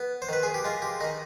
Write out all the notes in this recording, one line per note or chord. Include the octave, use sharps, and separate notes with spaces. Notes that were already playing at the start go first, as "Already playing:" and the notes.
Already playing: B3
C5
D#3 B4
G#4
G4
G#3 F4
G4
D#3 D#4